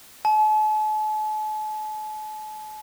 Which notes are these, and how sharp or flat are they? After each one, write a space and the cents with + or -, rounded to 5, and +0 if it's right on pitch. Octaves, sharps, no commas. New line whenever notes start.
A5 -45